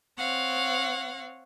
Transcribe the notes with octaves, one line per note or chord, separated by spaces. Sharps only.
C4 C#5 F5 F#5